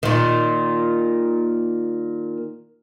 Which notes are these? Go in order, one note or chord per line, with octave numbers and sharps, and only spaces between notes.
A#2 D#3